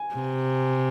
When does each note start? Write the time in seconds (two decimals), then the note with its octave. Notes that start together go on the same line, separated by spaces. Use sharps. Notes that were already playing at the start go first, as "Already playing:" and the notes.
Already playing: G#5
0.15 C3